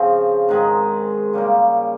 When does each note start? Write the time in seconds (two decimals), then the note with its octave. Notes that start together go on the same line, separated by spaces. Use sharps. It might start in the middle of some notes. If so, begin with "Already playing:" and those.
Already playing: C#3 F3 C4
0.49 G#2 D#3 G#3
1.33 C#3 G3 A#3